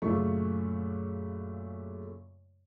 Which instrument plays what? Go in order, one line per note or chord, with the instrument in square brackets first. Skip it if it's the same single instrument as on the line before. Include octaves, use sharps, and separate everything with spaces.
[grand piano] F#2 A#2 C#3 A3 F4 C#6